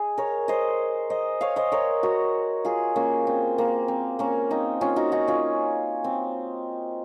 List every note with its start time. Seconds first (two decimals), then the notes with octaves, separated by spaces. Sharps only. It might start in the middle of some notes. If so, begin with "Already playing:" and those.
Already playing: G#4 D#5
0.18 A#4 C#5
0.48 C5 D#5
1.10 C5 D#5
1.41 C#5 F5
1.56 C5 D#5
1.72 A#4 C#5
2.03 F#4 A#4
2.65 F4 G#4
2.96 A#3 C#4
3.27 C4
3.58 A#3
3.88 C4
4.19 A#3 C#4
4.51 C4 D#4
4.81 C#4 F4
4.96 D#4 F#4
5.12 D#4 F#4
5.28 C#4 F4
6.04 C4